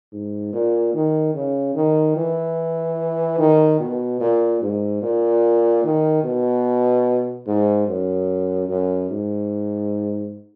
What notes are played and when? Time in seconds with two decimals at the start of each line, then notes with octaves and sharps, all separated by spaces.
0.12 G#2
0.53 A#2
0.94 D#3
1.34 C#3
1.75 D#3
2.16 E3
3.39 D#3
3.80 B2
4.20 A#2
4.62 G#2
5.02 A#2
5.83 D#3
6.24 B2
7.47 G#2
7.87 F#2
8.69 F#2
9.09 G#2